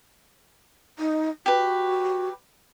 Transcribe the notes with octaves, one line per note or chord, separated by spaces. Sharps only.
D#4
F#4 G4 B4